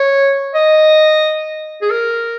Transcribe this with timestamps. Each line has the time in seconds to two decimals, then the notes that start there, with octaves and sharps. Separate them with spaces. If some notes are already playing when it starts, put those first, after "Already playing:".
Already playing: C#5
0.55 D#5
1.82 G#4
1.90 A#4